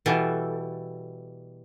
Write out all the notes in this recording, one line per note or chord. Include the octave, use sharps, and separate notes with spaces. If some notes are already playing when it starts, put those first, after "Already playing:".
B2 E3 G3 A4